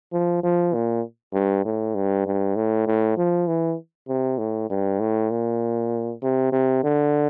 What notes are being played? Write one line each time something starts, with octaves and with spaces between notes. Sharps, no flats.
F3
F3
A#2
G2
A2
G2
G2
A2
A2
F3
E3
C3
A2
G2
A2
A#2
C3
C3
D3